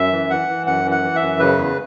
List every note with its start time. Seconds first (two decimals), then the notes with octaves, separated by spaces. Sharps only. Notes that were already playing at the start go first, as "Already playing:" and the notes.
Already playing: F#2 E5
0.12 E3
0.30 E3 F#5
0.49 E3
0.66 F#2 F#5
0.85 E3
0.91 F#5
1.03 E3
1.16 E5
1.21 F#2
1.39 C#3 B4
1.57 E2